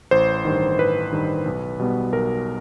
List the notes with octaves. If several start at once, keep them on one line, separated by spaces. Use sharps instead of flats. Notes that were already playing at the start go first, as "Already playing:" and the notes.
A1 C5
G2 D#3
A1 B4
G2 D#3
B1
B2 G3 B3
B1 A#4